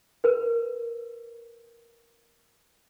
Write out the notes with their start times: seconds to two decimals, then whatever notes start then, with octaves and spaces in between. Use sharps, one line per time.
0.24 A#4 B4